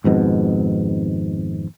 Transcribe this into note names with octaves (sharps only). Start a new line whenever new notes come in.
G#1 F2 G#2 B2